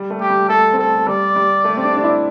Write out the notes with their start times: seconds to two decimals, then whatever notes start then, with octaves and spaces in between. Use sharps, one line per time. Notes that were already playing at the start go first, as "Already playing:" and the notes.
Already playing: G3
0.10 A3
0.20 G4
0.30 G3
0.49 A3 A4
0.73 C4
0.78 A3 A4
0.97 A3
1.07 G3 D5
1.36 G3
1.64 A3
1.77 C4
1.85 D4
1.97 D4
2.03 E4